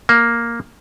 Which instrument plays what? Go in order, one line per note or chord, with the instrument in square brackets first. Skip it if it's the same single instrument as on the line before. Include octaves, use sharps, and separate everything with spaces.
[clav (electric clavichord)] A#3